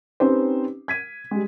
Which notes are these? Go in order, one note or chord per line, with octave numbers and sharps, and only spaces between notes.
C4 C#4 D#4 G4 B4 C5
G#6 B6 D#7
G3 G#3